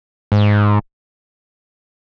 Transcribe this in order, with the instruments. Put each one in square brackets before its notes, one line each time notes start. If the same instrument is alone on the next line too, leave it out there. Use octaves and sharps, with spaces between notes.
[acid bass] G#2